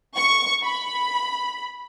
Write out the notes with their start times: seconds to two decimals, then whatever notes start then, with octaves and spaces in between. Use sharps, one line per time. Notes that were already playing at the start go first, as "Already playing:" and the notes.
0.16 C#6
0.63 B5